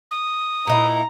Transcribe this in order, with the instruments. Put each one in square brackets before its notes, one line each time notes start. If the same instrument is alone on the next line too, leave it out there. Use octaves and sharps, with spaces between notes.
[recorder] D#6
[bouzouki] A#2 D#4 E4 [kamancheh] A#5